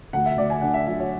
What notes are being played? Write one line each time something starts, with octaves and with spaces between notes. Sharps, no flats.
D2 F#5
E5
D2 D5
G#5
D3 F#5
E5
F#3 E5
C#5